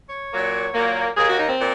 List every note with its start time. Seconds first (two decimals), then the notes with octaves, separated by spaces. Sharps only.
0.10 C#5
0.32 A#2 F#3 A#3
0.74 A#2 F#3 A#3
1.16 D#2 D#3 A#3 G#4
1.27 F#4
1.38 D#4
1.48 C4
1.59 A#2